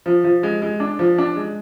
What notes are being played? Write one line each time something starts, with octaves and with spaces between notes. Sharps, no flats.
F3
F3
G#3
G#3
D4
F3
D4
G#3